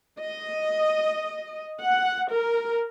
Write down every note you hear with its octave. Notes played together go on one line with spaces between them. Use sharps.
D#5
F#5
A#4